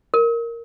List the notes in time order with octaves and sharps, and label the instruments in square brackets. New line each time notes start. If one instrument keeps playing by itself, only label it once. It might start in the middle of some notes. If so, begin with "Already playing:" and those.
[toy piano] A#4